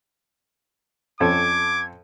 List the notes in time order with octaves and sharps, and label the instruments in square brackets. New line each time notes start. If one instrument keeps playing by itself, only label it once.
[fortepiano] F2 C#4 A4 [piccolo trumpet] D6 [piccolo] G#6